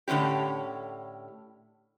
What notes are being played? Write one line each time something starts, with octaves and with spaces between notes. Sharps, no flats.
A2 D3 G#3 C#4 G4